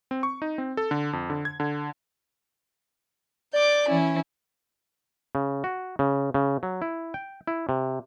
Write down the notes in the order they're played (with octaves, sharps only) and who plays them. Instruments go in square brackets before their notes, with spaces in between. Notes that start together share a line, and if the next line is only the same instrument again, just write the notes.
[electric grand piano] C4
C#6
D#4
C4
A4
D3
F2
D3
G#6
D3
[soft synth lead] D5 [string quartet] D6 G6
[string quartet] E3 C#4 E4
[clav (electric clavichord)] C#3
F#4
C#3
C#3
F#3
E4
G5
E4
C3